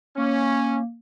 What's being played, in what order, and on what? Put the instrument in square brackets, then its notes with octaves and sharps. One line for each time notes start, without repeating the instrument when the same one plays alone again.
[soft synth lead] A#3 [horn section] C#4